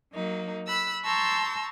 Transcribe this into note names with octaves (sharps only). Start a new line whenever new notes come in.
F#3 A#3 D#4
B5 E6 F#6
A5 A#5 C6 C#6 E6 G6